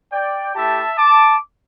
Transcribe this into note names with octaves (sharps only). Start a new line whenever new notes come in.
D5 G5
A3 E4 G4 E5 A5
A5 D6